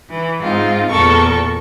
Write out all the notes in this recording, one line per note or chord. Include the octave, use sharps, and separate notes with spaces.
E3
G#2 C4 D#4 F4
E2 A#2 A4 A#4 C#6